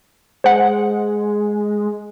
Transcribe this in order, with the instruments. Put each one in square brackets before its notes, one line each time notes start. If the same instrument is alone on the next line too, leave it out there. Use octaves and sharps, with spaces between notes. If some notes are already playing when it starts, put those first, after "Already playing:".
[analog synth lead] G#3 [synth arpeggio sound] C5 F#5